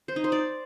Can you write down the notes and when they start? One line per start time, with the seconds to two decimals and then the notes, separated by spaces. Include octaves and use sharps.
0.08 C5
0.16 D#4
0.24 C5
0.32 D5